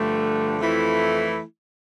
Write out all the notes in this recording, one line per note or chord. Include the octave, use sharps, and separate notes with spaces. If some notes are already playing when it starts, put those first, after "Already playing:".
Already playing: G2 D3 F3 A3
F2 E3 A3 E4